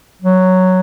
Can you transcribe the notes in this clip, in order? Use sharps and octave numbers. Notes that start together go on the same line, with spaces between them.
F#3